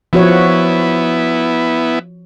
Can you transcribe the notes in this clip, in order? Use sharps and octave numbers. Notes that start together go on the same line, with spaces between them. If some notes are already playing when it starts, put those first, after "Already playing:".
F3 B3 E4 F#4 C#5